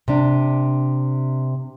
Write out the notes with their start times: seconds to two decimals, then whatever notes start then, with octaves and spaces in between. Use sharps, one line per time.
0.08 C3 D4